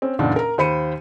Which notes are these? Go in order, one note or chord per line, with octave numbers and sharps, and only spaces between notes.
C4 C#4
F#1 E2 A#2 D4 D#4 F#5
A#4 A#5
D#2 C5 B5 C#7 D#7